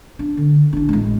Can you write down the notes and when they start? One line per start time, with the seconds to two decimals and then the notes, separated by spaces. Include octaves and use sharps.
0.19 D4
0.37 D3
0.73 A1 D4
0.89 A1 G#3